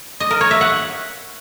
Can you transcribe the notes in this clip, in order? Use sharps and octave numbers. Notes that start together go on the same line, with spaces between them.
D#5
A#4
C#5
E5
F#5